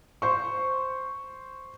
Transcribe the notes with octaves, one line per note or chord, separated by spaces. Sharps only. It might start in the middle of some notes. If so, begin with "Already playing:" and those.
C5 C#6